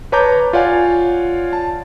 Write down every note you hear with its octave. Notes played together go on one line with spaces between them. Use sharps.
B4 C#5 A5 A#5 D6 G6
F4 C#5 D5 F5 F#5 G#5
A5